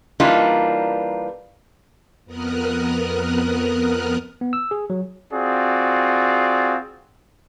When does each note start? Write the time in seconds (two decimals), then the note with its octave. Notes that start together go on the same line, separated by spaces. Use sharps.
0.20 E3 G3 A#3 D4 D#4 F4
2.25 F2 B3 A#4 D#6 F6 F#6
4.41 B3
4.53 E6
4.71 G#4
4.90 F#3
5.33 C4 F4 F#4 G#4 D5